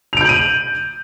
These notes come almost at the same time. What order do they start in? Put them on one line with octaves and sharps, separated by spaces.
F7 D7 G6 F#7 D#7